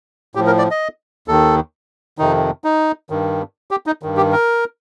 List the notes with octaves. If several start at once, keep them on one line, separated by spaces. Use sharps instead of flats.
A2 F3 G4
A#4
D5
D#5
D#2 D#3 A4
F2 C3 D#3 D#4
D#4
G2 D#3
G4
D#4
G2 D#3
G4
A#4